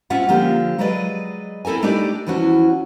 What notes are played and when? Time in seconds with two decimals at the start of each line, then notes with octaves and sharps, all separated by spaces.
0.10 C4 C#4 F4 E5 F#5
0.28 D3 F3 A#3 F4 G4
0.78 F#3 G#3 G#4 B4 D5 D#5
1.65 C4 E4 A4 A#4 G#5
1.83 A3 D4 D#4 G4 D5
2.27 E2 E3 F3 C#4 F#4